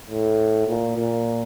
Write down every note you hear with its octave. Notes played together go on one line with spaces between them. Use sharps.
A2
A#2
A#2